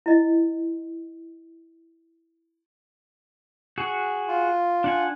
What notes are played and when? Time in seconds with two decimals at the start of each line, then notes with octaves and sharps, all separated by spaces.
0.06 E4 D#5
3.78 F#4 G#4
4.28 F4
4.84 D4 F#5 G#5